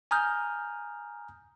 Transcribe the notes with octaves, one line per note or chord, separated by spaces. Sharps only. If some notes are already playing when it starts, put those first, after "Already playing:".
G#5 A#5 D#6 F6 G6